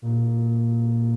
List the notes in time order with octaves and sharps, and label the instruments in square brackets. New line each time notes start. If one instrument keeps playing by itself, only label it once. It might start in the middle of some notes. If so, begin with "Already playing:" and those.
[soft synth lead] A#2